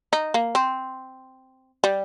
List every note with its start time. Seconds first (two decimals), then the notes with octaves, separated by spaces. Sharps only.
0.13 D#4
0.34 A#3
0.55 C4
1.84 G3